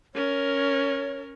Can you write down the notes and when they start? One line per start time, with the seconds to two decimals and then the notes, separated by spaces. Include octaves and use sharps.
0.15 C#4 A#4 C#5